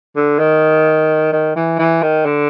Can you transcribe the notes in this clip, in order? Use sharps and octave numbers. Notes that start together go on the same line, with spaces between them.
D3
D#3
D#3
E3
E3
D#3
D3